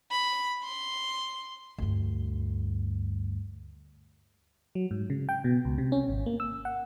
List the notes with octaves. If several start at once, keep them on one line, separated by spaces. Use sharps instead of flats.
B5
C6
D2 G2
F#3
G#2
C#3
G5
B2
C#2
C3
C#4
G#1
A#3
E6
F#5